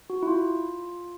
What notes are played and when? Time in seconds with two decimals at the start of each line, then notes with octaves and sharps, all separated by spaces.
0.10 F#4
0.22 E4
0.27 F4